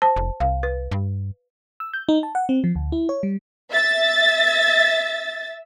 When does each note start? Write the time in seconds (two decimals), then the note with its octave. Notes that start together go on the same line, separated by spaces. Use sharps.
0.02 C5 A5
0.16 F1
0.40 C2 F5
0.63 B4
0.91 G2
1.80 E6
1.94 G6
2.09 D#4
2.23 A5
2.35 F#5
2.49 C4
2.64 F3
2.75 D2
2.92 E4
3.09 C#5
3.23 G3
3.71 E5 A6